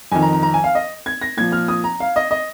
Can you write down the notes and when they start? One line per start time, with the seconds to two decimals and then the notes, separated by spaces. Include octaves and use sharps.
0.12 F2 D#3 G#5
0.22 A#5
0.33 A#5
0.43 A#5
0.54 G#5
0.64 F5
0.75 D#5
1.06 G#6
1.22 A#6
1.37 A#2 F3 G#6
1.52 F6
1.68 D#6
1.84 A#5
2.00 F5
2.16 D#5
2.31 D#5